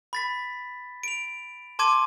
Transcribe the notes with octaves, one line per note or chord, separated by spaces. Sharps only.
B5 A6 B6
D7 F7
A5 C6 D6 G#6 D#7